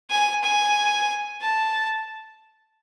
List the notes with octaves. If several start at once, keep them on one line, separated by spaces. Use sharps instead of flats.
G#5
G#5
A5